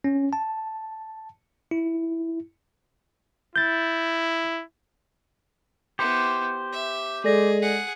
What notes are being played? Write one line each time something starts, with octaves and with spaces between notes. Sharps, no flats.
C#4
A5
E4
E4 G6 A6
B3 E4 G4 C5
E5
G#3 G#4 A4 D5 A#6
G#4 F#5